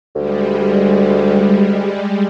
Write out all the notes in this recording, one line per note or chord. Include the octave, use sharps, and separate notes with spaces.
D2 G3 G#3